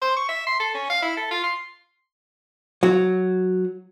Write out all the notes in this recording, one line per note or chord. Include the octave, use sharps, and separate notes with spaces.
C5
C#6
E5
C6
A4
C#4
F5
E4
A4
F4
C6
F#3